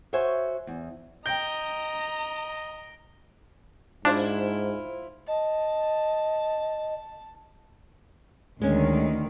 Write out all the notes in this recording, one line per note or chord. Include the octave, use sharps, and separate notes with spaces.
F#4 C5 C#5 E5 G#5
E2
D#5 G5 A#5 G6 A#6 D7 G7
G#2 D4 E4 F4 C5
D#5 A5
D2 D#3 G#3 C#4